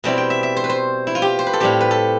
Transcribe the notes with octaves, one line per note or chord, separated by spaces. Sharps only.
B2 G3 C4 E4
G5
E5
E5
C5
B4
C5
E4
F4
G4
C5
B4
A4
A2 G3 C4 G4
B4
A4